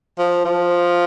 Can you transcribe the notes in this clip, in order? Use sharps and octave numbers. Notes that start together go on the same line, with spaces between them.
F3
F3